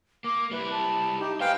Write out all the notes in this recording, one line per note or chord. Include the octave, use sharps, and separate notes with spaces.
A#3 D6
G3 E4 B4
A5
D#4 G4
D#4 B4 C5 F5 G5